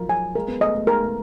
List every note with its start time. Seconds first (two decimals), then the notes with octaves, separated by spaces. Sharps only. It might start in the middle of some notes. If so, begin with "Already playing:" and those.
Already playing: F3 F#3 A#4
0.09 G#5
0.35 G#3 A#4
0.48 B3
0.61 A3 D#5
0.75 A3
0.87 G#3 A#4
1.03 G#3